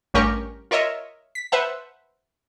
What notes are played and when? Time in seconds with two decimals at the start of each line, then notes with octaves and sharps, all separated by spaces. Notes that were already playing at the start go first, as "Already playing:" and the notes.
0.14 A1 G2 C#4 G4 A#4 C#6
0.71 F4 A#4 C#5 D#5 E5
1.35 B6
1.52 B4 C5 E5 F#5 A5